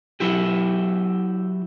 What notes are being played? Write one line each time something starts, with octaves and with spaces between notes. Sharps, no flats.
F#3 E4 G4